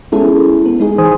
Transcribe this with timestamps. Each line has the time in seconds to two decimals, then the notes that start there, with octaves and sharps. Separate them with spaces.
0.12 G#3 B3 C#4 E4 G#4 A4
0.66 B3
0.80 G#3 D#4 G#4
0.98 E3 C5 G#5 D#6